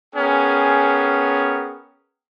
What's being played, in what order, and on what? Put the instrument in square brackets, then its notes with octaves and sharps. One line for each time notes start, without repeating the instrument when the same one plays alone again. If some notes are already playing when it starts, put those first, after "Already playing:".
[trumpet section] B3 C#4 G#4 A#4 G5